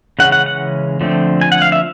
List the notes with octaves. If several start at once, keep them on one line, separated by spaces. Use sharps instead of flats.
C#3 E3 G#3 C#4 F#5
F#5
F#5
D3 F3 A3 C4
G#5
F#5
F5
E5